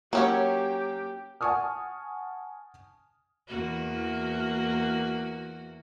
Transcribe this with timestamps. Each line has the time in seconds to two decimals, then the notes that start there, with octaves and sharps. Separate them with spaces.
0.13 F#3 A#3 C#4 G4 C#5
1.41 F#5 G#5 A5 C#6 D#6 F6
3.47 E2 A#3 F#4